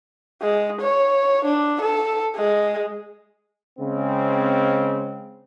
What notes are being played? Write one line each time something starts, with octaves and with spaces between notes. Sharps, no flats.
G#3
C#5
D4
A4
G#3
C#3 G#3 C4